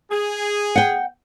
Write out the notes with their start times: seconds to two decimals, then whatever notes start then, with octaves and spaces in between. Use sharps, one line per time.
0.11 G#4
0.76 F#5 G5